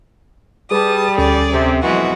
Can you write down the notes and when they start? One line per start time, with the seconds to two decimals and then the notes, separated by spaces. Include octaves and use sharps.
0.71 G3 G#4 B4 A5 D6 D#6
1.18 D2 C#4 G#4 A4 D5
1.50 C3
1.83 F2 B2 E3 F#3 G#3 F#4